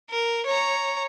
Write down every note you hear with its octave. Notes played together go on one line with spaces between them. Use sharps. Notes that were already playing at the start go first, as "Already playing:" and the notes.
A#4
C#5 A#5